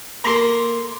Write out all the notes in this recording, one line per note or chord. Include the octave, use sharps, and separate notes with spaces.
A#3 A4 A#4 A#5 C6